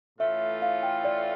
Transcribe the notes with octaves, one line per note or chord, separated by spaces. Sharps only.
A2 E3 A3 C#4 F4 E5
F5
G5
D5